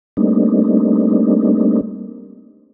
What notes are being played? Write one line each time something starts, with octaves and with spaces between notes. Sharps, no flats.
G3 A3 A#3 C4 D4 D#4